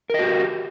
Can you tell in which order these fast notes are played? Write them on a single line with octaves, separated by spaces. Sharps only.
A#4 D#5 F#4 G4